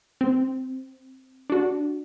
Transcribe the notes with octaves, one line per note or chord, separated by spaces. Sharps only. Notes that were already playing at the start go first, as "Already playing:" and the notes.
C4
D4 F#4